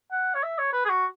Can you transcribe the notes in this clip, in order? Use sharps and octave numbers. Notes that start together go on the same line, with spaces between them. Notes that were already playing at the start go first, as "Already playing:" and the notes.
F#5
C#5
E5
C#5
B4
G#4
F#4